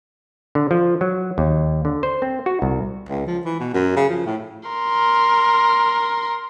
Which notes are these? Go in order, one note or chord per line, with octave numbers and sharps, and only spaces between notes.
D3
F3
F#3
D#2
D3
C5
C4
F#4
C2
C#2
F3
E3
B2
F#2
C#3
F3
A2
A#4 C6